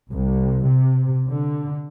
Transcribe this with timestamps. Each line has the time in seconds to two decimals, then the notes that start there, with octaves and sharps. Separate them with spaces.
0.11 C2
0.67 C3
1.27 D3